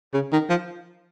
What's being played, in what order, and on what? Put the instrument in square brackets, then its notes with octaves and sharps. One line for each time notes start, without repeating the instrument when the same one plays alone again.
[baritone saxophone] C#3
D#3
F3